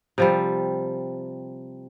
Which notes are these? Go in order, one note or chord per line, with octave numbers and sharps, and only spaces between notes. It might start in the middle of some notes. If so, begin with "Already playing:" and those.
C3 F3 G3